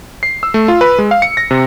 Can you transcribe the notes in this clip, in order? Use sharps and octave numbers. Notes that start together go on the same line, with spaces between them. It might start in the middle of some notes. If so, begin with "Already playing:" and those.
C7
E6
A3
F4
B4
G#3
F5
C#7
A#6
C3